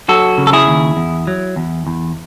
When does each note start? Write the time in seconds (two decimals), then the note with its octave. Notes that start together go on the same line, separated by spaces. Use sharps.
0.08 F#3 F#4 A4
0.38 C#3
0.47 A4
0.53 E4 G#4
0.67 D#2
0.97 E2
1.27 F#3
1.56 E2
1.87 E2